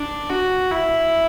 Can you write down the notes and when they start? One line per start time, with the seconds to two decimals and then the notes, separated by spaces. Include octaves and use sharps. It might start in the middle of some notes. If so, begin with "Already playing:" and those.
Already playing: D4
0.30 F#4
0.72 E4